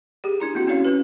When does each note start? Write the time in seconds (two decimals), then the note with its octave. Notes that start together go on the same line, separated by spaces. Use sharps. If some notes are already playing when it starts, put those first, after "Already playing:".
0.24 G4 G#4
0.40 D4 E4 A#5
0.55 A#3 C4 E4 F#4
0.67 C#4 E4 F4 C#5 F5
0.85 C#4 B4